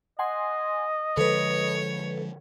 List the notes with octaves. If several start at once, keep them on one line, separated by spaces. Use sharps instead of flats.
D#5 F#5 G#5 C6
D3 F3 G#3 A4 B4 C#5